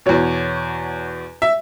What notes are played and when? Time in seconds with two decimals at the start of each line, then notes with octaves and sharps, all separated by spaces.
0.06 E2 B2 C#5
1.42 E5